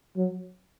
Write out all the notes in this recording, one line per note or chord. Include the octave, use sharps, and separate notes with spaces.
F#3